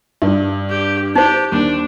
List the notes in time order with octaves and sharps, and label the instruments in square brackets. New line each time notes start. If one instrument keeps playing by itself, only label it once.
[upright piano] G2
[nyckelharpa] G4
[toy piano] D#4 C5 [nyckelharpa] G4
[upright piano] D#2 [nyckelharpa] D4